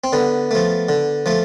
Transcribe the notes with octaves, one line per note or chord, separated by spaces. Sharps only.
C4
D3 B3
F3 A3
D3
F3 A3